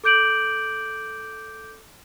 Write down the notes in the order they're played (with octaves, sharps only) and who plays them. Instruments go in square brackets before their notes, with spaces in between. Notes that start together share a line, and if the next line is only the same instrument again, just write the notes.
[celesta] A4 D6 G6 D7 F#7